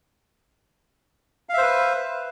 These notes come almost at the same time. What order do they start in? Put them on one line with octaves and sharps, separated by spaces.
F5 E5 C5 B4